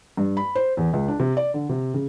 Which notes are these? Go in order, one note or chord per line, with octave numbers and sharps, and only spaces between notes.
G2
B5
C5
E2
C#2
D4
C3
D5
D3
C3
C#3